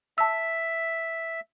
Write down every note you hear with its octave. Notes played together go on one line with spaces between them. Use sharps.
E5 A5 E6